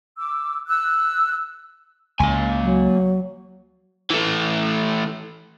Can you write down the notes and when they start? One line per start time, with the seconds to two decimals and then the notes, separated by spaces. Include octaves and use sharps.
0.18 D6 E6
0.68 E6 F#6
2.20 C#2 A#3 G#5
2.63 F#3
4.11 E3 A3